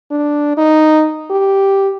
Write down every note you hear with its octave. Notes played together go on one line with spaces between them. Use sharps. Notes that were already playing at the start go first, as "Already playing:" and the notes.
D4
D#4
G4